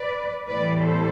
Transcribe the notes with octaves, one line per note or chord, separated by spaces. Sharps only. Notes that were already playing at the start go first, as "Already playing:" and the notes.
Already playing: B4 D5
A2 E3 G3 B3 B4 D5
A4 C5